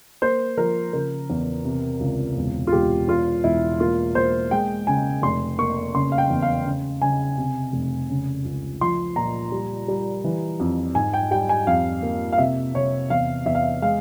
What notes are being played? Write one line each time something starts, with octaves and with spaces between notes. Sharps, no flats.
A#3 C5
F3 A#4
C#3 A#4
E2
C3
C#2
E1
F4
E1 G4
E2 F4
E1 E4
A#3 F4
A#3 C5
G#3 G5
C#3 G#5
F1 C6
A#3 C#6
C#3 C6
F5
G5
E2
F5
C#3
C#3 G#5
C3
F1
C#3
C#2
F3 C6
A#2 A#5
G3
G3
E3
F2
G#2 G#5
G5
G3 G5
G#5
F2 F5
A#3
F5
C3 E5
C3 C#5
E2 F5
E2 E5
F5
E5
G#3 F5